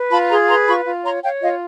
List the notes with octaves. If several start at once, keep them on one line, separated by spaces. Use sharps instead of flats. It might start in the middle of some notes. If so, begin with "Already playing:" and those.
Already playing: B4
F4 A5 B5
G#4 A#5 C6
B4 A#5 C6
F4 B5 C#6
F4
C#5 A#5 C6
C#5 F5 G5
F4 D#5 F5